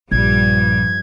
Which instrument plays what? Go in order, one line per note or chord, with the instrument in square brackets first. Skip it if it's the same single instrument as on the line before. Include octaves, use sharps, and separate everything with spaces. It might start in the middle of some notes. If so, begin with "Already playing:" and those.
[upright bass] A#1 [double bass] G2 F3 [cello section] G3 [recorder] G#6